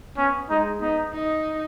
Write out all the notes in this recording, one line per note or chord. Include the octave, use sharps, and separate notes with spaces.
B3 C#4
G#3 D#4
B3 D#4
D#4